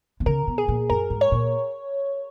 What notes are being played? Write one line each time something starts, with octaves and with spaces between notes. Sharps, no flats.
B2
C#3 A#4
B2
G#4
A#2
F#2 A#4
G#2
C#5
A#2